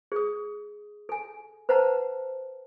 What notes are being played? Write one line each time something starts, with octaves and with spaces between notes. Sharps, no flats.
G#4 D#6
A4 G#5
B4 C5 F#5 A5 A#5